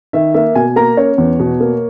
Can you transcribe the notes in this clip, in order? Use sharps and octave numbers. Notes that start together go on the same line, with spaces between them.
D#3 E5
A#3 E5
B2 G#5
A#3 A#5
C#4 C#5
E2
B2
A#3